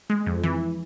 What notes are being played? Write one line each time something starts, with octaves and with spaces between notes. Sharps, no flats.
G#3
F2
E3